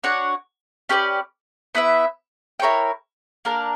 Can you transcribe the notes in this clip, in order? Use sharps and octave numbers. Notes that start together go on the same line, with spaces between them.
D4 F#4 C#5 F#5
C#4 G4 B4 D5
B3 E4 B4 E5
E4 A#4 C#5 G5
A#3 D4 A#4